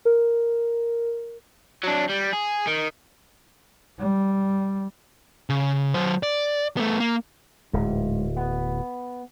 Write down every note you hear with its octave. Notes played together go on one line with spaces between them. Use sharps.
A#4
F#3 D4
G3
G#4
D#3
G3
C#3
F#3 C5
D5
A3 B3
A#3
D1 G#2
B3